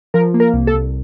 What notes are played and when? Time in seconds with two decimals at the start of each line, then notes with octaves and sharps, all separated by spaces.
0.14 F3 A#4
0.34 A#3
0.40 A#4
0.54 C2
0.67 A4
0.74 C2